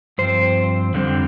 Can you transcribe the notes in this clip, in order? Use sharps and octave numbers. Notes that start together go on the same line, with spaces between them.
G2 F3 C4 C5
F2 D3 G3 C4